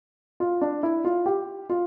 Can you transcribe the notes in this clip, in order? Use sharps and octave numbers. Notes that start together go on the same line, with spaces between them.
F4
D4
E4
F4
G4
F4